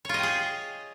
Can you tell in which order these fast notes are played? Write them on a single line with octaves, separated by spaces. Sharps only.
C#5 F4 D#5 G5 G#4